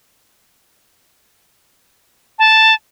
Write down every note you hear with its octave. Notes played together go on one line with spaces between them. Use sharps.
A5